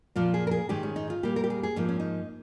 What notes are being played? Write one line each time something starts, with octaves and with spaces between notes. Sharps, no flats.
A#2 F3 A#3 F4
G#4
A#4
G#4
G#2 D#3 G#3 G4
C#4
D#4
F4
A#2 G3 A#3 G4
A#4
G4
G#4
G#4
G#2 F3 A#3 D#4
C#4
D#4